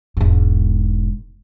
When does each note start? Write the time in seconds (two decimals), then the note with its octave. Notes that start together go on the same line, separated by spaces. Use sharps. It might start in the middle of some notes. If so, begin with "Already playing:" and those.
0.17 E1 G#2